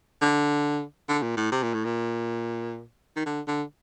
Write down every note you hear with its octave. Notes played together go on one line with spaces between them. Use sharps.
D3
D3
A#2
A2
C3
A#2
A2
A#2
D#3
D3
D3